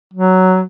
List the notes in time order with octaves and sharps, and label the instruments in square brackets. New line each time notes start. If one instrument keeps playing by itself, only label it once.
[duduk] F#3